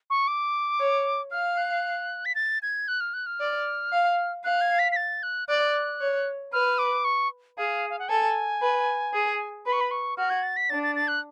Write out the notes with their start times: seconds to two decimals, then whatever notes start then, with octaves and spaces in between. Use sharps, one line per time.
0.10 C#6
0.28 D6
0.79 C#5
1.31 F5 F6
1.58 F#6
2.25 B6
2.35 A6
2.62 G#6
2.88 F#6
3.00 F6
3.14 F#6
3.26 F6
3.40 D5
3.92 F5
4.44 F5 F#6
4.61 G#6
4.79 B6
4.92 B6
4.96 A6
5.23 F#6
5.48 D5 F#6
6.01 C#5
6.52 B4 F6
6.78 D6
7.04 C#6
7.57 G#4 F5
7.90 F5
7.99 F#5
8.09 A4 G#5
8.61 B4
9.13 G#4
9.65 B4 B5
9.73 C#6
9.81 B5
9.91 C#6
10.17 F#4 F6
10.30 G#6
10.43 A6
10.57 B6
10.70 D4 A6
10.83 A6
10.96 A6
11.08 F#6